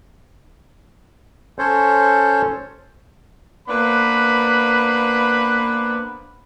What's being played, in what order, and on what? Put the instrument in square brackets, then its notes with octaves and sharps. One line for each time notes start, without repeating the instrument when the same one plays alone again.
[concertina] C#4 A4 C5 C#5
[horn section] A#3 B3 D4 B4 C5 B5